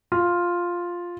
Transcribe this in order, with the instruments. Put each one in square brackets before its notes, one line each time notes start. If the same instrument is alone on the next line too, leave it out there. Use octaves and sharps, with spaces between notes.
[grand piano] F4